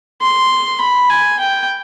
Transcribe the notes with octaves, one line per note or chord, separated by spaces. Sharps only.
C6
B5
G#5
G5